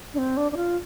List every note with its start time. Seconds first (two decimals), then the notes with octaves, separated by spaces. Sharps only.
0.14 D4
0.18 C4
0.37 D4
0.52 D4
0.56 F4